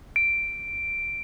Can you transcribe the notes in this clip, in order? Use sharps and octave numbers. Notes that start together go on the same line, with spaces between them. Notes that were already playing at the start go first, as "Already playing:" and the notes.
D7